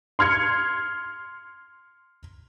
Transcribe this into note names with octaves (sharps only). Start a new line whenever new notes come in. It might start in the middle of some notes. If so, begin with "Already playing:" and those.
C6 F6 G#6 C#7